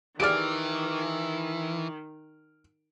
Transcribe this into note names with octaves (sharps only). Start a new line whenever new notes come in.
D#3 E3 G4 G#4 D5 F6 D7